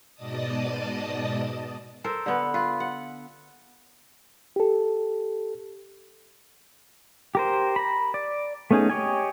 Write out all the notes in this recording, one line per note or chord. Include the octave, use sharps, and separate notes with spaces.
G#2 B2 D5 D#5 A5 D#6
A4 A#4 C5
D3 B3
F4 B4
F#5
G4 A4
G4 A#4 C5
A#5 B5
D5
A3 B3 C#4 D#4 G#4
G4 C#5 D#5 G#5